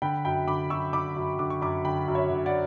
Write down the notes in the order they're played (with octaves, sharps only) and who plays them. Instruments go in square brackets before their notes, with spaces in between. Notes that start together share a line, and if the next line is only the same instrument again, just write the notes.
[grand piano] D3 G5 B5
F#2 G5 B5
D3 B5 D6
F#2 C#6 E6
D3 B5 D6
F#2
D3 D6
C#6
F#2 B5 D6
D3 G5 B5
F#2
C#5 E5
D3
D5 F#5